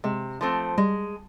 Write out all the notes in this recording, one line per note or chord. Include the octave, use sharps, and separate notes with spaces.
C3 G#3
F3 A3 C4
G3 G#3